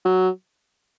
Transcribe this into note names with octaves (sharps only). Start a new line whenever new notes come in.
F#3